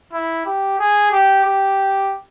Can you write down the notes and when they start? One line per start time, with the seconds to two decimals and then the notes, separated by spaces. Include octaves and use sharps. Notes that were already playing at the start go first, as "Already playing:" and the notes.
0.13 E4
0.46 G4
0.79 G#4
1.12 G4
1.45 G4